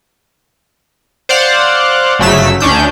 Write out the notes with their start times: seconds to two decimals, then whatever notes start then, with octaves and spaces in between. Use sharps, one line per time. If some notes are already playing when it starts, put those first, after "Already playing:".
1.29 C5 D5 F5 F#5
2.19 G1 C#3 F#3 A3 E6 B6
2.60 D2 C#4 D4 G6